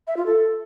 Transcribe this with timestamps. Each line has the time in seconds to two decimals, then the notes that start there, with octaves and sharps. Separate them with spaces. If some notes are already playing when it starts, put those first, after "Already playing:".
0.07 E5
0.17 F4
0.26 A4